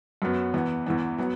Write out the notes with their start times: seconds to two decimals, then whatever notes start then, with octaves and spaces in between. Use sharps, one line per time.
0.22 F#2 F#3 B3
0.54 E2 E3 B3
0.86 E2 E3 B3
1.18 F#3 B3